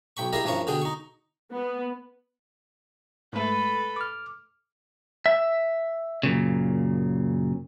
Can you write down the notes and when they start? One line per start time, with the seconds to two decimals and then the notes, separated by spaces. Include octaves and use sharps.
0.17 B1 G5 B5 C#6
0.33 E4 G4 G#4 A#4 D#5 F5
0.44 G2 E3 F3 C#4 A#4 C#6
0.67 B2 D3 G#4 G5 G#5
0.82 D#4 C#6
1.54 B3
3.33 G#2 A3 A4 B4
3.96 D6 F6
5.26 E5
6.23 F#2 A#2 C#3